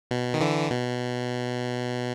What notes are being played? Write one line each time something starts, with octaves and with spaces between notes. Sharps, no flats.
B2
D#3
D3 E3
B2